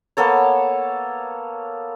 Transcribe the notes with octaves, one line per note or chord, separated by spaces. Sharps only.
A#3 B3 A4 C#5